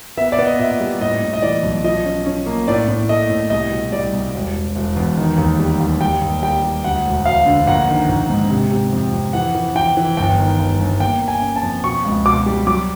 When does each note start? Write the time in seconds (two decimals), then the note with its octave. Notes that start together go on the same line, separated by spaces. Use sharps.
0.18 B3 E5
0.32 D5
0.38 B3
0.46 D#5
0.59 A#2 E5
0.80 G3
1.01 A2 D#5
1.22 A2
1.34 D#5
1.42 E3 D5
1.63 B1
1.84 F3 D#5
2.05 C#4
2.26 C#4
2.46 A#3
2.68 A2 D5
2.88 A2
3.09 A3 D#5
3.30 A2
3.50 C2 D#5
3.71 B2
3.92 G3 D5
4.13 C2
4.34 E1
4.55 E1
4.76 E1
4.96 E2
5.17 D#3
5.38 D#2
5.59 G3
5.80 D#2
6.00 G3 G5
6.22 D#2
6.43 G3 G5
6.63 G3
6.84 D2 F#5
7.05 E1
7.26 E1 F5
7.46 D3
7.67 A#1 F#5
7.88 D#3
8.09 A#1
8.30 G#2
8.50 C3
8.71 C3
8.93 F2
9.13 F2
9.33 E3 F#5
9.55 E3
9.75 E3 G5
9.97 E3
10.17 G1 G5
10.38 D#3
10.59 G1
10.80 G1
11.00 A#3 G5
11.21 A#3
11.28 G#5
11.42 C#3
11.56 A5
11.63 F2
11.83 B2 C#6
12.04 C#2
12.25 B2 D6
12.46 G3
12.67 F#3 D6